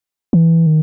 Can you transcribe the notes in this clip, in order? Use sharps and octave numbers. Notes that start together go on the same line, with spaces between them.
E3
D#3